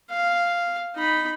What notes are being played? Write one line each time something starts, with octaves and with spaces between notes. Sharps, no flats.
F5
D#4 B5